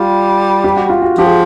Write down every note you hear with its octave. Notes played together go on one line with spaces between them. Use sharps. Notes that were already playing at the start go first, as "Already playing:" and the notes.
Already playing: G3 F4
G4
F#4
F4
F#4
F3 G4
G#4